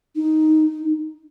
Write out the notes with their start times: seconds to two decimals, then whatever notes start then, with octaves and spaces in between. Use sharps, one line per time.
0.16 D#4